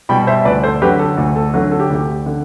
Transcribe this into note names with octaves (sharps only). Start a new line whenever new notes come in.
B2 G3 G5 B5
C5 E5
D2 B4 D5
A4 C5
D3 F#3 G4 B4
A4
D2
A4
D3 F#3
A4
G4
D2 G4
D3